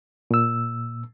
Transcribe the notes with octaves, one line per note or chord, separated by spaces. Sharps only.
A#2 E6